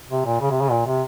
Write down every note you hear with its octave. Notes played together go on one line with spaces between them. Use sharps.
C3
A#2
C#3
C3
C#3
A#2
C3